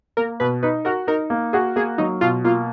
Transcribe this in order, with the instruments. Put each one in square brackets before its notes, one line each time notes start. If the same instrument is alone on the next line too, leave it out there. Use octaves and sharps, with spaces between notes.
[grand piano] A#3 [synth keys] A#4
[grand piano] B2 [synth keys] B4
[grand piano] D#4 [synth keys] B4
[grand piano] F#4 [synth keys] A#4
[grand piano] D#4 [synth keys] A#4
[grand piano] A#3
[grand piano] F#4 [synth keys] G#4
[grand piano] A#3 [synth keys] G#4
[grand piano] F#3 [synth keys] D#4
[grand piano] B2 [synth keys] F4
[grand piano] A#3 [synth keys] F4